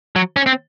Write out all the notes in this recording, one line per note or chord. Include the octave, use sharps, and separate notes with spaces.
F#3
C#4
C4